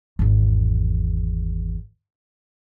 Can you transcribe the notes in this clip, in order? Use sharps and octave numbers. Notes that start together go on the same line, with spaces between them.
G#1 E2